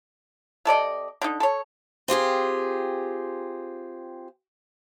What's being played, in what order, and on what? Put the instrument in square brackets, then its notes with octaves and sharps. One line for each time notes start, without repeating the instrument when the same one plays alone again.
[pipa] C3 A4 D5 D#5
D3 D#4
A4 C#5
[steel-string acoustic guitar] C4 F4 G4 G#4